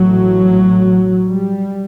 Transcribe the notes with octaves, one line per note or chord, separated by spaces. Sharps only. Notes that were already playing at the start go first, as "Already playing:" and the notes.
Already playing: A1 A2 F#3
G3